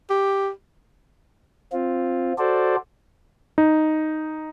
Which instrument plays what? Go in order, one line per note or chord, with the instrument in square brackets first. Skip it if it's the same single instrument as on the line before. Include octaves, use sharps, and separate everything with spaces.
[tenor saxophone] G4
[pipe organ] C4 F4
F#4 A4 C5 D5
[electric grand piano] D#4